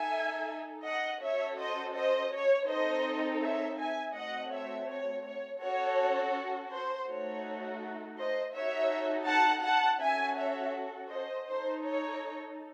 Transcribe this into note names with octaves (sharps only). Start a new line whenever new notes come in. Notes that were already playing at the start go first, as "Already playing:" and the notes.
Already playing: D#4 A4 E5 G#5
D#5 F#5
C#4 F#4 A4 C#5 E5
C5 D#5
C5 D#5
C#5
C4 D#4 A4 C5 D#5
C#5 E5
E5 G#5
A3 C4 F#4 D#5 F#5
C#5 E5
C#5
C#5
C#4 F#4 A4 C#5
C5
A3 D#4 F#4 A4 C#5
C5 D#5
D#4 F#4 A4 C#5 E5
F#5 A5
F#5 A5
C#4 F#4 A4 E5 G#5
C#5 E5
C5 D#5
D#4 A4 C5
C#5